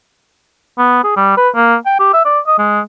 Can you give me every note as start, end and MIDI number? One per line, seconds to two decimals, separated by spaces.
0.78 1.02 59
1.04 1.14 68
1.16 1.36 55
1.37 1.49 71
1.55 1.75 58
1.86 1.95 79
1.99 2.09 67
2.13 2.21 76
2.25 2.39 74
2.47 2.57 75
2.58 2.80 56